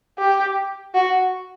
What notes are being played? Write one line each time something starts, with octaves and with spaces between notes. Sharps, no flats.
G4
F#4